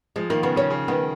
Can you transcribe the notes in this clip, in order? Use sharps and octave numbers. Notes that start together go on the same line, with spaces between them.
F3 G#3
D#3 A#3
C#3 B3
C#3 C#4
C#3
D#3 B3